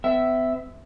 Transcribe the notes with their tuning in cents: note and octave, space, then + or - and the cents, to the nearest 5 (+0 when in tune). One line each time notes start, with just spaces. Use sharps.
B3 +45 E5 +0